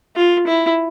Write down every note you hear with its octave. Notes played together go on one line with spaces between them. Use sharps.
F4
E4